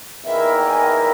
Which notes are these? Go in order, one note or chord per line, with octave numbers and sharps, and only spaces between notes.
E2 D#3 A#3 E4 A#4 E5
G5
G#5
G5
E5